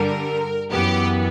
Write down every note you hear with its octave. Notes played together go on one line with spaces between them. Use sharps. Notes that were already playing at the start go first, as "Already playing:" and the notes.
Already playing: G2 D3 G3 A#4
F#2 E3 B3 G4